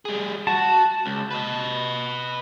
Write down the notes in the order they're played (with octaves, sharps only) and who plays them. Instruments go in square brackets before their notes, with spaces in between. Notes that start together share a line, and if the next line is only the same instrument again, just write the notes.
[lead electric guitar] G3 G#4
[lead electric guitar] F#4 [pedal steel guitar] A5
[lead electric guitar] C#2
B4 D#5